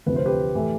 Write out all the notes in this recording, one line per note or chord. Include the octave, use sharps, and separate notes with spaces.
D2 C3 F3 B4
C5
G4 B4
A2 E3 A3